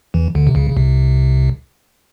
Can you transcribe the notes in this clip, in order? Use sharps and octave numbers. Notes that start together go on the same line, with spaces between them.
E2 E3
D2 D3
C3
C#2 C#3
C#3
C2 C3